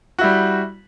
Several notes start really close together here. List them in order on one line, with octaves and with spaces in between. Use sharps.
F#4 E4 G3